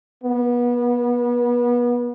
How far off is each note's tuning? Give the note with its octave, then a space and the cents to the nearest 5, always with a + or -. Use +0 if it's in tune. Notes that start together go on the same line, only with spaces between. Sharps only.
B3 -30